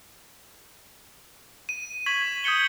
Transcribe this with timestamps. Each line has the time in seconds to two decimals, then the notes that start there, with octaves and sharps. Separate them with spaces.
1.69 D#7
2.06 C#6 G#6 B6 F#7
2.44 D#6 G6 G#6 B6 C#7 G7